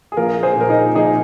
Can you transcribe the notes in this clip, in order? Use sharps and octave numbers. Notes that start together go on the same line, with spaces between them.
G#4
A#1 F4 A#4
G#4 C5
A#2 F3 A#4
D#4 G#4
A#1 D#4 G#4